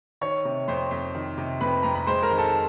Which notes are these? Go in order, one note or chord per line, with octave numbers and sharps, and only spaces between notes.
D#3 C#5 C#6
C3
F2 C5 C6
F2
D#3
C3
F2 B4 B5
F2 A#5
B5
G#3 C5 C6
A#4 A#5
D#3
A4 A5